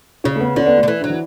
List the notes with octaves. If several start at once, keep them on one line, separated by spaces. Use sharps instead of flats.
C#3 C#4
A3
B3
D3 C#4
B3
A3
D3
E3
D3 F#3
E3